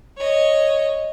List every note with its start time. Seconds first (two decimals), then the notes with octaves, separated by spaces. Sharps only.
0.18 C#5 D#5